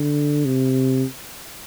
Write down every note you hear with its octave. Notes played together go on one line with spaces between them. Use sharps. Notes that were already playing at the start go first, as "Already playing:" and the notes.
Already playing: D3
C3